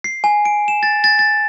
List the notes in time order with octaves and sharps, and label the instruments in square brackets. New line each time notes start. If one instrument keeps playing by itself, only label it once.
[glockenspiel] C7
G#5
D7
E7
A6
A6
A6